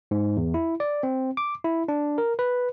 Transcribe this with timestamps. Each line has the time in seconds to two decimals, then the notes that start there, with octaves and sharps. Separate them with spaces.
0.11 G#2
0.37 E2
0.54 E4
0.80 D5
1.03 C4
1.37 D6
1.64 E4
1.88 D4
2.18 A#4
2.39 B4